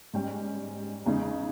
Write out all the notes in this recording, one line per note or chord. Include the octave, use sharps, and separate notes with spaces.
G#2 G3 C#4 G5
E2 C#3 G#3 D#4